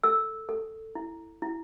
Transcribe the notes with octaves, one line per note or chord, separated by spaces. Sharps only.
A4 E6
A4
E4
E4